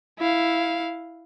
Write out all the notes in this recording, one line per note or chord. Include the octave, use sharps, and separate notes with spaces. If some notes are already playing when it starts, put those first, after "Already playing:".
E4 F5